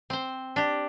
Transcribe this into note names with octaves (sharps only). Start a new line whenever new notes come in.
C4 C5
D4 G4